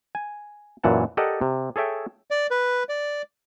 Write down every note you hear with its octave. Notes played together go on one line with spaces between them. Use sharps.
G#5
F#2 A#2 E3 F#5 A5
G4 A4 A#4 D5 D#5 F#5
C3
G#4 A4 C#5 E5 G5
D5
B4
D5